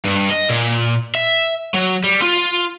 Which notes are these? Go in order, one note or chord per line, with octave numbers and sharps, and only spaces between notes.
G2
D#5
A#2
E5
F#3
G3
F4